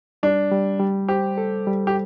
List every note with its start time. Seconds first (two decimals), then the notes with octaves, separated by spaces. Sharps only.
0.23 G3 D4
0.52 G3
0.80 G3
1.08 G4 C5
1.38 A4
1.67 G3
1.87 G4